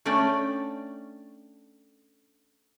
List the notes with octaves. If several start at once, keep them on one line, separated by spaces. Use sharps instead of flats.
A3 C#4 D4 D5 G5